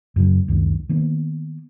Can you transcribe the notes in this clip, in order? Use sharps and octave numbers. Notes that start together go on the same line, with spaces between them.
F#2 C#3 F#3
C#2 F#2 D#3
D#3 A#3 B3